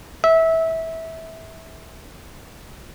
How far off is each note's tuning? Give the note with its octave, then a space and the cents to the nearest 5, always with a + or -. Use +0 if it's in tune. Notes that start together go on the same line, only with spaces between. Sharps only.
E5 -20